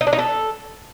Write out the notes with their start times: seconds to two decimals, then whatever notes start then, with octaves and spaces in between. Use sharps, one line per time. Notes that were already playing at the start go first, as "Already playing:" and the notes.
0.01 D#4
0.07 D4
0.13 D#4
0.19 A4